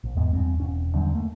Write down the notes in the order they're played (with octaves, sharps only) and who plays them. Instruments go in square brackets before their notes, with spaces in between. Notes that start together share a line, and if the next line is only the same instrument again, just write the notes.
[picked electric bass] A#1
E2 G#2 G#3 B3
E2 G2 C4
E1 C#4
E2 G2 D3 F#3
A3 A#3